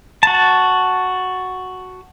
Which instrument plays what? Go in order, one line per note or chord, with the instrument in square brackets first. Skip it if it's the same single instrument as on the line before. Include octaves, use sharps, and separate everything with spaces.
[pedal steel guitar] F#4 A5